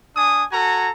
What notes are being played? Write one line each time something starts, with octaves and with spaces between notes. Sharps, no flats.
D4 G#5 D#6
F#4 A4 G#5 A#5